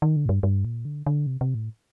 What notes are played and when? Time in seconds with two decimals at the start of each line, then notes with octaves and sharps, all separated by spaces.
0.02 D#3
0.16 D3
0.26 A2
0.29 G2
0.43 G2
0.65 A#2
0.85 D3
1.06 D3
1.27 C3
1.41 C3
1.55 A2